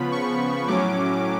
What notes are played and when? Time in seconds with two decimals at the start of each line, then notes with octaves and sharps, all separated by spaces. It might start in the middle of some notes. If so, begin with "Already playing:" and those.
Already playing: C#3 F3 B3 B5
0.11 C#6
0.68 A2 F#3 C#4 D6